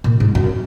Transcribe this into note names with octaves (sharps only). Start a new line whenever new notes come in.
A#2
G#2
F#2